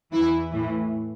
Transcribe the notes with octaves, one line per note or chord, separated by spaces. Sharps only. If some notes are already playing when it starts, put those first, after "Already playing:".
E2 E3 E4
A2 E3